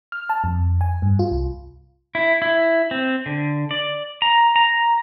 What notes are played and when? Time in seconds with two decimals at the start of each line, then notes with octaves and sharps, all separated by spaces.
0.12 F6
0.29 A5
0.44 F2
0.81 G#5
1.02 G2
1.19 F4
1.31 C2
2.15 E4
2.42 E4
2.91 C4
3.26 D3
3.71 D5
4.22 A#5
4.56 A#5